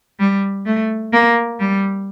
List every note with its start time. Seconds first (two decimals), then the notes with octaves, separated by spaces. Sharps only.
0.20 G3
0.66 A3
1.13 A#3
1.60 G3